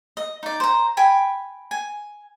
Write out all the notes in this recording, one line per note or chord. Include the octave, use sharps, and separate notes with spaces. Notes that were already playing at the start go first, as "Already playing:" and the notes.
D#5
D#4 D5
C5 A#5
G5 G#5 B5
G#5